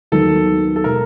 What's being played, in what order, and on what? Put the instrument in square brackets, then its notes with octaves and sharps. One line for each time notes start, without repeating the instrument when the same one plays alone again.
[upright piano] D#2 D#3 F#3 B3 [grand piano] A4
[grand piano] A4
[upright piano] B2 G#3 B3 [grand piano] A#4